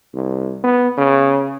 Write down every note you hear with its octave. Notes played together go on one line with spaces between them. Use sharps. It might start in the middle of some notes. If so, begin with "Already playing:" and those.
C2
B3
C#3